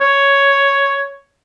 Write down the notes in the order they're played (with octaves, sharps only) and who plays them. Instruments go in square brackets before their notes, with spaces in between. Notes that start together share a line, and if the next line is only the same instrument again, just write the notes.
[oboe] C#5